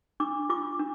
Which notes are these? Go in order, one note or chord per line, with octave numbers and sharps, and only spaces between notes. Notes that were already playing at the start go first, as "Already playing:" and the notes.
D4 D6
F4 D6
D4